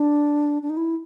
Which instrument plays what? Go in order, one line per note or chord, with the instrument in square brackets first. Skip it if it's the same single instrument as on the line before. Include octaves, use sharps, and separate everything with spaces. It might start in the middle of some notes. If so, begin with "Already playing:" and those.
Already playing: [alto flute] D4
D4
D#4
E4